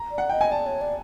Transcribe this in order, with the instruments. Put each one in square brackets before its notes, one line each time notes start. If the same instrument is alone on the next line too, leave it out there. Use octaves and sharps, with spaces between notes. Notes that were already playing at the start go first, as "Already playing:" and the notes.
Already playing: [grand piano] A#5
[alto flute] D5
[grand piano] F#5
[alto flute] D#5 [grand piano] G5
[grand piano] G#5
[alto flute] D5 [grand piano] A5
[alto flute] C#5
D5